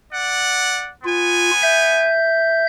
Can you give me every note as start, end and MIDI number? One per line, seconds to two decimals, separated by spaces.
0.11 0.90 74
0.11 0.90 78
1.04 2.14 59
1.04 1.51 65
1.04 2.14 80
1.62 2.67 76
1.62 2.67 91